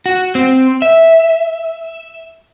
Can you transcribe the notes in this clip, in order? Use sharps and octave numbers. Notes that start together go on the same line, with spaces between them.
F#4
C4
E5